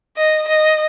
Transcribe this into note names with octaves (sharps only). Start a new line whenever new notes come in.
D#5
D#5